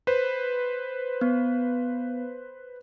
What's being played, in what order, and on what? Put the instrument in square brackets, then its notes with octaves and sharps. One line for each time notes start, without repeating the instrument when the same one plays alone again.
[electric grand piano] B4 C5
[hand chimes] B3